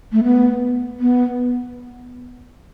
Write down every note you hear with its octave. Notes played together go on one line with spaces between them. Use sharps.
A3
B3
B3